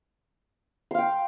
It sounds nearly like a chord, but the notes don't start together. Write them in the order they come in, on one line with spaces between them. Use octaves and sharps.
C6 F5 G5